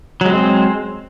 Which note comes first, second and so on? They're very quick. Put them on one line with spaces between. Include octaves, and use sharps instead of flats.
F#3 G#3 C4